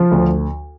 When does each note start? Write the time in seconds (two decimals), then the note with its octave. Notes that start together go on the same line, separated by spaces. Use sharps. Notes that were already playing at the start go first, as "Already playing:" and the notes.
Already playing: F3
0.12 D2